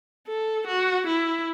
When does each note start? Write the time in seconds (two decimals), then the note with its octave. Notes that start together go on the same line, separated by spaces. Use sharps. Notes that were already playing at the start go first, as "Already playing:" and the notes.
0.28 A4
0.67 F#4
1.07 E4